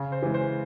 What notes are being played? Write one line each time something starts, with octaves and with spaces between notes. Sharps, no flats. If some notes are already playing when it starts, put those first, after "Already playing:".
Already playing: C#3
C5
E3 G#3
C5